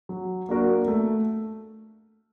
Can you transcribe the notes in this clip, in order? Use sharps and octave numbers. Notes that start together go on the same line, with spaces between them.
F#3
A#3 D4 F#4 A#4
A3